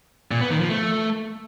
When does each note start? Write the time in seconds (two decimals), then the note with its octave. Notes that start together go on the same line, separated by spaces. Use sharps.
0.31 A#2
0.41 B3
0.50 D#3
0.60 F3
0.69 A3